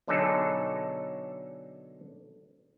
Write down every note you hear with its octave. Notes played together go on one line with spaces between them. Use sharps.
B2 D3 F#3 D#4 G#4 A4